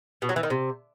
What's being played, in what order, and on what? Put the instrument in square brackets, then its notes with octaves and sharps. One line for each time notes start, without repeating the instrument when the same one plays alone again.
[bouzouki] B2
F#3
E3
D#3
C3